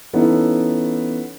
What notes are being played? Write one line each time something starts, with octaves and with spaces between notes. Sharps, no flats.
E3 B3 C#4 D#4 E4 A4